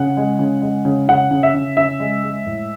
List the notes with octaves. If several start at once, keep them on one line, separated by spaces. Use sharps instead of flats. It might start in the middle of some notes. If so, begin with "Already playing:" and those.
Already playing: C#3 F#5
G#3
C#3
G#3
C#3
C#3 F#5
C#3
E5
C#3
C#3 E5
G#3
G#3
A2